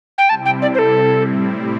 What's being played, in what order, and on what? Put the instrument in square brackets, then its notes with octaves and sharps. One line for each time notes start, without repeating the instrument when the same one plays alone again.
[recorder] G5
[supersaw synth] C3 G3 C4 E4 [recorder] A5
[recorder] G5
D5
C5
A4
[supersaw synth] A2 G3 C4 E4